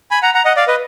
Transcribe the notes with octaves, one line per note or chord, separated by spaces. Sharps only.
G#5 B5
F#5 A#5
F#5 A#5
D#5 F#5
D5 F5
B4 D#5